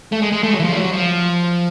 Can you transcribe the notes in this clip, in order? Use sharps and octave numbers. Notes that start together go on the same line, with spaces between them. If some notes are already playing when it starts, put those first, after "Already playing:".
A3
G#3
G#3
A3
F#3
E3
F3
G3
F#3
F3